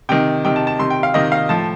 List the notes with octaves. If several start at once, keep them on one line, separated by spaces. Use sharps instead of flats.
C3 D#3 G5
C3 D#3 G5
A5
A5
C3 D#3 C6
G5
F5
C3 D#3 D#5
F5
A2 F3 A5